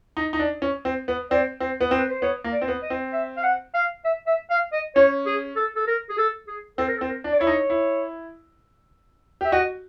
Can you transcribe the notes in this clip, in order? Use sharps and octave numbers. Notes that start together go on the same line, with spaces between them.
D#4
D#4
D4
C#4
C4
B3
C4 D5
C4
B3
C4
B4
C5
B3 C#5
A#3
D5
C4
B3
D#5
C4
E5
F5
F#5
F5
E5
E5
F5
D#5
C#4 C#5
G#4
A4
A4
A#4
G#4
A4
G#4
C4 A4
A#4
A4
C4
A#4
D4
D5
E4 C#5
D#4
E4
G4 E5
F#4 D#5